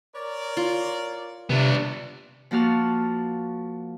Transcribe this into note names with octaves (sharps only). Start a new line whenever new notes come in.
A#4 C#5 D5
F4
C3 B3 D4
F3 A#3 F#4 A5 F6